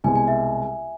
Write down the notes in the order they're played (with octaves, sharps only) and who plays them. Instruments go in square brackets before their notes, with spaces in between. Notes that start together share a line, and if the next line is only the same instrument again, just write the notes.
[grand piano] C2 B2 G#3 [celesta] G#5
[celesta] G#5
E5